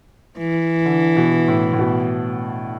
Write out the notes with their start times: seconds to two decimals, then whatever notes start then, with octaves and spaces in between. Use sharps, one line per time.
0.38 E3
0.85 D3
1.16 B2
1.48 A2
1.73 A2
1.79 B2